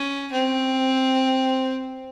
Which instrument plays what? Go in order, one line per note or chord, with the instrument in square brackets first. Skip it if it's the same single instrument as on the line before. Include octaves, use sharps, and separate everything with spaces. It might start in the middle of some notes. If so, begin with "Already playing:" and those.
Already playing: [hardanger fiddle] C#4
C4